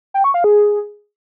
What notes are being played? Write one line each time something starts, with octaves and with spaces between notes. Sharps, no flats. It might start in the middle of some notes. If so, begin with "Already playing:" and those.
G5
C#6
F5
G#4